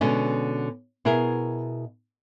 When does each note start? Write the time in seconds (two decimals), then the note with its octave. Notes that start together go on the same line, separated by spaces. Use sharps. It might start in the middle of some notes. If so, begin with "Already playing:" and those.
0.01 B2 D3 G#3 C#4
1.05 B2 E4 G#4 A#4